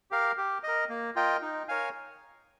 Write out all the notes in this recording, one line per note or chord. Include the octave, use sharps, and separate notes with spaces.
G4 A#4 F5
G4
A#4 D#5
A#3
F4 A#4 D#5 G5
D#4
A#4 C#5 F5 G#5